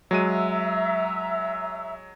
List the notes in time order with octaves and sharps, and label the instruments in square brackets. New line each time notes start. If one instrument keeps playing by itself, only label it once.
[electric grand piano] F#3 G#3 D#7 [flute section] E5 A#5 E6